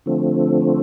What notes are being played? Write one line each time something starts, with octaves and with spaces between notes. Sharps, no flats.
D3 F3 A3 C4